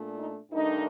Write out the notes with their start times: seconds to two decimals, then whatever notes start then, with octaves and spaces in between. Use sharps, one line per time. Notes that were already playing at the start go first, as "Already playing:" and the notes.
Already playing: A#2 A3 D4
0.18 D#4
0.52 G2 D#3 A3 D4 D#4